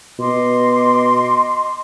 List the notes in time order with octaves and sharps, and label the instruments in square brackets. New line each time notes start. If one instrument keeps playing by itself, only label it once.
[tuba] B2 [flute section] D#5 C6 D6